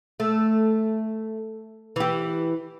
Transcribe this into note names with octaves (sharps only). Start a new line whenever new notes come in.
A3
E3 G4